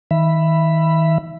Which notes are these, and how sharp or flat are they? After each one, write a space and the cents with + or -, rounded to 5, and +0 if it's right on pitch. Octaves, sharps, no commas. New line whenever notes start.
D#3 +35 E5 +20 B5 +0